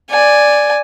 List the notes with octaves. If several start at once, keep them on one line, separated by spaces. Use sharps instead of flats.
D5 G#5